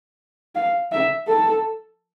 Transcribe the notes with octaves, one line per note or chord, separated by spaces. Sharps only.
F5
E5
A4